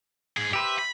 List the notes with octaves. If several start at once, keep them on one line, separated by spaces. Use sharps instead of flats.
G#2 G#4
G4 B4 C5 E5
B5